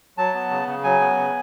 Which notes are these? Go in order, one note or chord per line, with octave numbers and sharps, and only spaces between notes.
F#3 A5
B3
C#3
C#3
F#3 G#5
B3
C#3